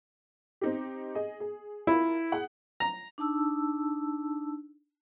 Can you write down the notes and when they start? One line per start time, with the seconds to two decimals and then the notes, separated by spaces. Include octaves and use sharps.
0.61 C4 D#4 G4
1.15 G#4 D#5
1.40 G#4
1.87 E4 F4 A#4
2.32 G#4 F#5
2.80 A#5
3.18 D4 D#4 A5 E6